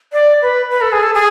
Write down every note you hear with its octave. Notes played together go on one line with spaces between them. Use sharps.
D5
B4
B4
A4
G#4
A4
G#4